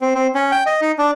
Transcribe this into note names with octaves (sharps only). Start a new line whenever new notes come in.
C4
C4
C#4
G5
D#5
D#4
D4